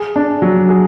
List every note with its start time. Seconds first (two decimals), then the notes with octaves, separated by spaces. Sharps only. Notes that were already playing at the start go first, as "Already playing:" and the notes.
Already playing: G#4
0.16 D4
0.42 F#3
0.69 G#4